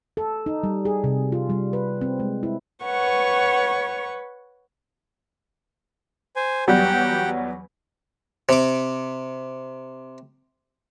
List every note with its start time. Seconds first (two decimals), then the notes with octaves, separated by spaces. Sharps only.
0.17 A4
0.46 D#4
0.63 G3
0.85 G#4
1.04 C3
1.32 F4
1.50 G3
1.73 B4
2.01 C4
2.19 G#3
2.43 E4
2.85 B4 C#5 F#5 C#6
6.36 C5 G#5
6.68 E2 F#3 G3 G4 F#5 G5
8.49 C3 D6